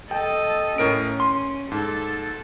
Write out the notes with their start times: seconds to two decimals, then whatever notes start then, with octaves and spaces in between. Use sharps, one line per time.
0.11 A4 D#5 G5
0.78 A2 C#4 A#4 D7
1.20 C6
1.72 G#2 A4